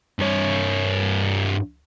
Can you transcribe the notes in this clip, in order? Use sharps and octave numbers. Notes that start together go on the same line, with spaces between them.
G2 C#5